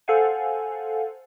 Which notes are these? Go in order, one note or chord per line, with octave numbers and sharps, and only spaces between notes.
A4 C5 F5 F#5 G#5